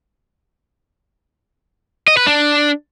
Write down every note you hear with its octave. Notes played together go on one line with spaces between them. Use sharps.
D#5
B4
D4